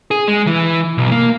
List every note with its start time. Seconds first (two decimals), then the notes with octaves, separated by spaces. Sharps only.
0.11 G#4
0.28 G#3
0.47 E3
0.98 B1
1.12 A#3